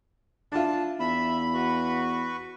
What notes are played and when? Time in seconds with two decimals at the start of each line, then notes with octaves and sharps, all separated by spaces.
0.52 D4 E4 F4 A5
0.99 E2 E5 B5 E6
1.54 F#4 B4 C#6